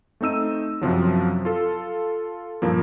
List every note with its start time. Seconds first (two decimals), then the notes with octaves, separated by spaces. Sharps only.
0.21 A3 C4 D#4 E6 D#7
0.81 F#2 C3 F3 F#3
1.45 F4 A4
2.62 G2 A#2 F3 A#3